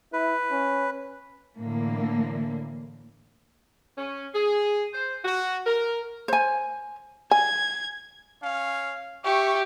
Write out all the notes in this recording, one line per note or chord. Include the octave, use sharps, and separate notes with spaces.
E4 B4
C#4
A2 D3 E3 A#3
C#4
G#4
C5
F#4
A#4
C5 G#5
G#5 G#6
C#4 F5
G4 E5 C#6